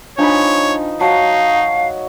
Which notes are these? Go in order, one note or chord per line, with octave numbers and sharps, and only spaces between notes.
F3 D4 D#4 C#5 G#5 B5
F#3 D#4 F5 A5